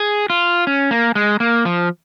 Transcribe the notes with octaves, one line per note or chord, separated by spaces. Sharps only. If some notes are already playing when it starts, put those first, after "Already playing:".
Already playing: G#4
F4
C#4
A#3
G#3
A#3
F3